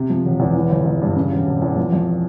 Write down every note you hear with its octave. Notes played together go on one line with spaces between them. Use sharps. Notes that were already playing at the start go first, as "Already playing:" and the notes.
Already playing: C3
F3
E1
E2
E3
G1
G1
G2
C#3
E1
E1
E2
F3
F2